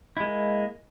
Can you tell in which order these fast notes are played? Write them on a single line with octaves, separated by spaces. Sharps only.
E4 G#3 A#3